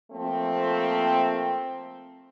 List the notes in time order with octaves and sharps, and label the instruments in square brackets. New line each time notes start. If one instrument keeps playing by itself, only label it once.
[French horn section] F3 A3 A#3 C4